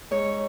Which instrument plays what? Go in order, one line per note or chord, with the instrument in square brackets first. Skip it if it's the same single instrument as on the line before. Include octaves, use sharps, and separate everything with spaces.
[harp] G#2 C#5